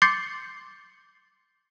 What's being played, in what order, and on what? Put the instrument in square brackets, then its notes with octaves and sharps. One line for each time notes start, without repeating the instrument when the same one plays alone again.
[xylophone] C6 D6 G6 A6 C7 C#7